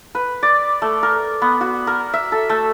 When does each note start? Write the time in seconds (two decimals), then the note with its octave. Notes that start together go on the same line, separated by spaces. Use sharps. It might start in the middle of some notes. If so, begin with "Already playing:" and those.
0.15 B4
0.43 D5
0.82 A3
1.03 A#4
1.42 B3
1.61 F#4
1.87 A#4
2.13 E5
2.32 A4
2.49 A3